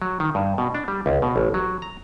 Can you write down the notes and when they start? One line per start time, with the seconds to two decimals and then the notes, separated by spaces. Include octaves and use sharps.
0.02 F#3
0.20 D#3
0.35 G2
0.58 B2
0.75 D4
0.88 G3
1.06 C#2
1.22 B2
1.36 A1
1.54 F#3
1.82 A#5